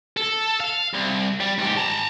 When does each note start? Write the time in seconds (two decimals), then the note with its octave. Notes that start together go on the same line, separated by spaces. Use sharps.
0.17 A4
0.60 F5
0.94 C2
1.40 G3
1.58 G#2 G4
1.77 A5 A#5